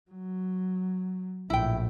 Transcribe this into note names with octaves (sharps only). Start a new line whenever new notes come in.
F#3
A#1 A2 E4 G5